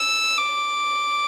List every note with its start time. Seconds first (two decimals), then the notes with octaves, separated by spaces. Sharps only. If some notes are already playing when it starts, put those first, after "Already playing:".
Already playing: E6
0.37 D6